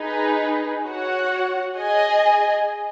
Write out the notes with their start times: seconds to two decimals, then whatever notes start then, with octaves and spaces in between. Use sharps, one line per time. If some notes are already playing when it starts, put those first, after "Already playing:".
Already playing: D#4 G#4 B4
0.85 F#4 C#5 F#5
1.76 G#4 D#5 G#5